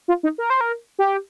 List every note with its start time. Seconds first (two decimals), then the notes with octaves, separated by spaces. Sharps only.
0.08 F4
0.23 D#4
0.38 A#4
0.50 C5
0.61 A#4
0.99 G4